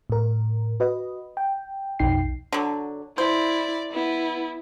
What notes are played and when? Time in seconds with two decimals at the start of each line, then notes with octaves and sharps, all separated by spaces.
0.10 A2 A#4
0.80 F#4 B4 D#5
1.37 G5
1.99 B1 F2 D#4 G5 C7
2.53 D3 F#3
3.18 E4 C5 D5
3.93 B3 E4